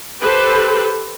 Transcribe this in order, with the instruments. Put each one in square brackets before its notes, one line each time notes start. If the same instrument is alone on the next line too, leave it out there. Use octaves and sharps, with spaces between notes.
[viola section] G4 A4 B4 C5